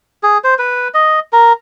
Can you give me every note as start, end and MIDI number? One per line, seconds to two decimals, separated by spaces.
0.23 0.38 68
0.44 0.54 72
0.59 0.88 71
0.94 1.20 75
1.33 1.53 70